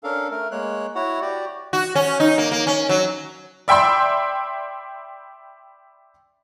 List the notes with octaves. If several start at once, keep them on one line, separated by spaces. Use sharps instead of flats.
C#4 D4 A4 A#4 F5
A3 A#4
G#3 A#3 C#5 F#6
E4 F#4 C#5 F#5
F#4 G4 D5
F#4
C#4
D#4
A#3
A#3
C#4
F#3
D5 E5 G5 B5 C6 E6